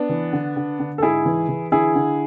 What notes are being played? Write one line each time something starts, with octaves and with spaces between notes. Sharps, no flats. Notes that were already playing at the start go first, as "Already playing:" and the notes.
Already playing: B3 D4
E3
D3
D3
D3
A4
G#2 E4 G#4
E3
E3
D3 E4 G#4
D3